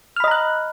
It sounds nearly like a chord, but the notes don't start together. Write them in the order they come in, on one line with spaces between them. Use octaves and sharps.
F6 B5 D#5 A#5 F#6